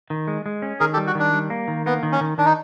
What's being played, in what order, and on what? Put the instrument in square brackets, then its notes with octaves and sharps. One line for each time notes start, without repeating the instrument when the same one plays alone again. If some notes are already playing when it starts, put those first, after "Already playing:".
[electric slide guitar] D#3
G#3
G#3
C#4
[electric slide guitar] D#3 [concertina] G#4 A#4
[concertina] G4 A4
[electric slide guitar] G3
[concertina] F#4
[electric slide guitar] D#3 [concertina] D4
[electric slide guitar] G3
A#3
D#3
[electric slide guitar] A#3 [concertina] B3
[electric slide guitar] D#3
[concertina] C#4
[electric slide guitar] D#3
[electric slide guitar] D#3 [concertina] D4
[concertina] D#4